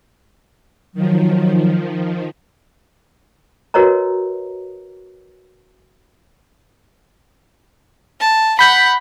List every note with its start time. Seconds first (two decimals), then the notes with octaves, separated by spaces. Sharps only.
0.94 D#3 F3 F#3
3.74 F#4 A#4 B4 C#5 D#5 A#5
8.20 A5
8.59 F#5 B5 G6 B6